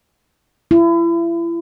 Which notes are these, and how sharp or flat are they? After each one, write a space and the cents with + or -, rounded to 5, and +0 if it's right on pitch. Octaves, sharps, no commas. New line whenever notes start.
E4 +35